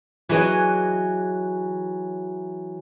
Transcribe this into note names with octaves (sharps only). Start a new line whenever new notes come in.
E3 F#3 G#4 D#5